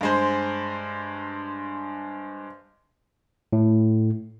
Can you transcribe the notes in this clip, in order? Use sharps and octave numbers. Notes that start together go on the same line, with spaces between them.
G2 G#3 C5
A2